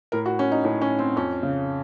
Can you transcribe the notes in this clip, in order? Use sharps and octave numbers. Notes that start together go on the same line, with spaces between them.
A2 A#4
F#4
C#4
D#4
A2 C#4
C#4
C4
F2 C#4
C#3